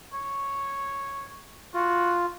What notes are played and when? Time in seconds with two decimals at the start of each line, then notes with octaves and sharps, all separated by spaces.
0.13 C#5
1.74 F4 F#4